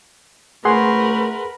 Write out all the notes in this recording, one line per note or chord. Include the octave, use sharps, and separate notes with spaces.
C#2 F3 A3 G#4 A#4 B4 F#5 C6